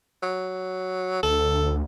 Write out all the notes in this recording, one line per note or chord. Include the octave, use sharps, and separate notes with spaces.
F#3
D2 A4